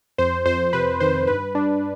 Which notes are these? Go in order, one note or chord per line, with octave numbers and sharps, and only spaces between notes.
F2 C5
F2 C5
C3 B4
D#3 C5
G2 B4
G2 D4